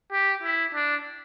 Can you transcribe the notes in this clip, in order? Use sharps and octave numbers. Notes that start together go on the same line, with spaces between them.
G4
E4
D4